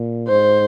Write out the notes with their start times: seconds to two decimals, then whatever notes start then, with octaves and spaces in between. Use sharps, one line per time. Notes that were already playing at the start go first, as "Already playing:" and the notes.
Already playing: A#2
0.29 G#2 C5